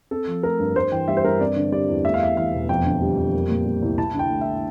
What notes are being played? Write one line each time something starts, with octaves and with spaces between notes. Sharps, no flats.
C4 A4
F3
A3 A#4
G2
G2 C5
E3 G5
G3 E5
C5
G2 A#4
C4 D5
D3
G3 D5
E2
A3 E5
F5
E2 E5
E3 F5
E1
F2 G5
D3
G3
F2
A#3
A#2
G3
C2
E4 A5
D3
G5
A3
E5